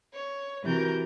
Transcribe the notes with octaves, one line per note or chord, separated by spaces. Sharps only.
C#5
C3 E3 F#4 A#4 G6